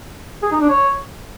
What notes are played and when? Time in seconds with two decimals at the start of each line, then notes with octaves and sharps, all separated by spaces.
0.43 G#4
0.52 D#4
0.61 D4
0.70 C#5